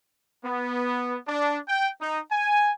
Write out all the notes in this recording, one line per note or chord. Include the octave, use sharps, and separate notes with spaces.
B3
D4
G5
D#4
G#5